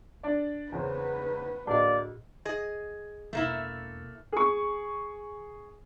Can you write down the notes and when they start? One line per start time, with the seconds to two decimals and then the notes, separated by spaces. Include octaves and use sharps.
0.23 D4 D5
0.72 E2 C#3 B4 C5
1.67 D2 A2 A#3 D5 D#5
2.45 G#4 D#5
3.33 E1 A3 A#3 E4
4.32 G#4 C#6